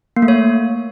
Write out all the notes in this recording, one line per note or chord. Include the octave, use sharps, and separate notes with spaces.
A#3
A3
C#5